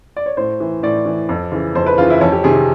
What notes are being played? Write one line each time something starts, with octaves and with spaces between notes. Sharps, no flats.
D5
C#5
A2 C5
E3
A2 D5
E3
F2
C#3 E3
F2 C5
B4
C#3 E3 F4
E4
F2 C#4
G4
C3 D#3 G#4